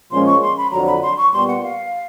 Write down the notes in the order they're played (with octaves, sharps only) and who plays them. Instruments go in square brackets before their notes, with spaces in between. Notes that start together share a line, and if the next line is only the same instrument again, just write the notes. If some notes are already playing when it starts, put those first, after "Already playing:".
[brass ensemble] A#2 F3 G#3 C#4 [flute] C6
[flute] C#6
C6
B5
[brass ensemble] F2 D3 F#3 [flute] A#5
[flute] B5
C6
C#6
[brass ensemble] A#2 G3 B3 [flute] C6
[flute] F#5
F5